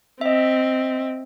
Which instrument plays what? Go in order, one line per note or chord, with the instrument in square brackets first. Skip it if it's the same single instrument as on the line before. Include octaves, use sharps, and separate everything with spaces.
[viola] C4 [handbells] D#5 E5